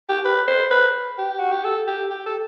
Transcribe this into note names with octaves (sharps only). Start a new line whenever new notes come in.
G4
B4
C5
B4
G4
F#4
G4
A4
G4
G4
A4